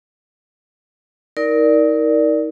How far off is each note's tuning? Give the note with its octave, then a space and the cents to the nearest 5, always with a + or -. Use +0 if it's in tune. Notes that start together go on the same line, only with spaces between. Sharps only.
D#4 +35 A#4 +0 D5 +0